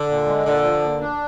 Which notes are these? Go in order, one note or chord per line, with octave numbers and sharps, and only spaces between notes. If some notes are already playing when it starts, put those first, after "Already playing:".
Already playing: D3
A#2
G#3
A#2 D3
F3
A#2
D4